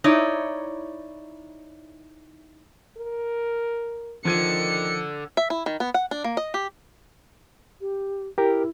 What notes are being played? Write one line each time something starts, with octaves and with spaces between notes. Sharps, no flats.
D#4 E4 C#5 D5
A#4
D3 D#3 F3 G#6 C#7 D#7
E5
E4
D#3
B3
F#5
D4
A#3
D#5
G4
G4
E4 G4 A#4